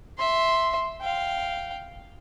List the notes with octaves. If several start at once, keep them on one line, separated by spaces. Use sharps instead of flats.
E5 C6
F5 G5